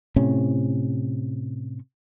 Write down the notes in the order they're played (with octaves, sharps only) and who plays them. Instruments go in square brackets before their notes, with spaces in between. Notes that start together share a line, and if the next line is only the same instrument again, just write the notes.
[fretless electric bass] A2 C3 C#4